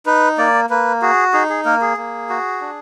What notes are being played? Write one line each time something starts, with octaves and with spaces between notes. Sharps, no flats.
D#4 B4
A#3 D5
A#3 B4
F#4 G#4
D#4 G#4
G#4
A#3 A#4
G#4
A#3
F#4
D4